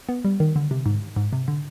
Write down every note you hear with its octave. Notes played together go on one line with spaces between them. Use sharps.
B3
G3
D#3
D3
C3
G#2
G#2
C3
D3